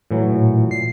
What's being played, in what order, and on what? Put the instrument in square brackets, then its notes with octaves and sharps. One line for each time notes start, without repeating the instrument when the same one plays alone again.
[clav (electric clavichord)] A2 E3 F#3
[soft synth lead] A#2
C7